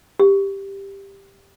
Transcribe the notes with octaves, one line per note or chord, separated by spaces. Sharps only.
G4